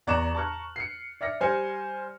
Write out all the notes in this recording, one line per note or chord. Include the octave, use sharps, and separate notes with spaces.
E2 D5 A#5 C#6 F#6 E7
A5 A#5 C#6 F6 F#6
C7 C#7
D5 E5 F6 A#6 C#7
G3 C5 G#5 F6 C#7